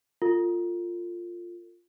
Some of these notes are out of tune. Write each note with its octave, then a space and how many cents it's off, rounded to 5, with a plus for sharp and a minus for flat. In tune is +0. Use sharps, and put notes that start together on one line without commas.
F4 +0 A4 +45